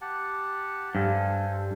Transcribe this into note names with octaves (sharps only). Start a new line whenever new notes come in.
G4 F#5 A5
G2 A4 C5 G#5